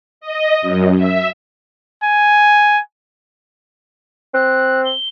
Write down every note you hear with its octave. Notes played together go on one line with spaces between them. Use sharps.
D#5
F#2
E5
G#5
C4 F#6
G7